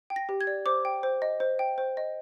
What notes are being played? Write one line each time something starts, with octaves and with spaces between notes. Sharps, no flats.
G5
A#6
G4
G#6
D5
C5 D6
G5
C5
D#5
C5
G5
C5
D#5